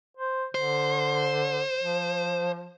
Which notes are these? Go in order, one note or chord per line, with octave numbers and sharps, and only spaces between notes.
C5
D3 C5
F3